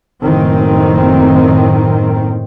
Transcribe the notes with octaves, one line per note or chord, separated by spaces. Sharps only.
F#1 A2 D#3 C4